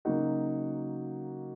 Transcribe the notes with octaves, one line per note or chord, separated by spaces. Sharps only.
C#3 F#3 A#3 D#4 F#4